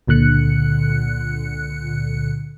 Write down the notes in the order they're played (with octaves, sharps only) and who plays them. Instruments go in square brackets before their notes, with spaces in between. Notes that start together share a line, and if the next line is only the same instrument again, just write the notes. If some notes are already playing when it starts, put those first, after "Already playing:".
[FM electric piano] C#2 A#2 D3 F#6 C#7